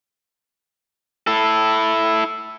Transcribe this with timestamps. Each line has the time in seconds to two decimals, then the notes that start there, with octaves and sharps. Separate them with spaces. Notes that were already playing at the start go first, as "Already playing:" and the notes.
1.27 E4 A4